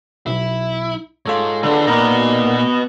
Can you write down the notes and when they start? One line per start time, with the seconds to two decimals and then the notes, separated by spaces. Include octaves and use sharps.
0.26 B1 E4
1.26 G#2 F4 A4 C#5
1.63 D3 G#4 B4
1.87 A#2 B3 D#4 A#4 B4 D5 D#5